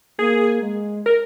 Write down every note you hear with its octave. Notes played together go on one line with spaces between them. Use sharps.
A#3 G#4
G#3
A#4